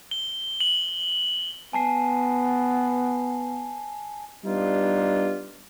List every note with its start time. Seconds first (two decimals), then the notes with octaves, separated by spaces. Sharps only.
0.11 G7
0.61 F#7
1.73 B3 G#5 A5 C7
4.45 G3 B3 D4 D#4 F4